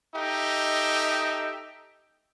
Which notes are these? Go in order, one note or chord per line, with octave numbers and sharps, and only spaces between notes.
D#4 G4 A4 D#5 E5 G5